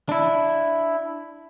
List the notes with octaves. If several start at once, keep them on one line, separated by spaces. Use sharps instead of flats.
D4 E4